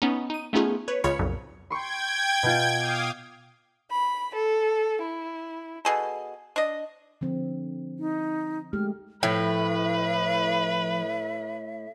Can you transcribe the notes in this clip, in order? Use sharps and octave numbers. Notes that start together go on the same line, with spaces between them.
B3 C#4 D#4
D#4 D#7
A3 B3 C#4 D#4 F4 G#4
B4 C#5
C#2 C#3 F4 C#5 B5 C#7
B1 F2 A#2 C#3
G5 C6 C#6 G#6
B2 F4
F5 D6 D#6
B5
A4
E4
B2 G#4 A4
D4 D#5
D3 F3 C4
D#4
G#3 A3 G4 F6
A2 F3 E4 B4 E5 G5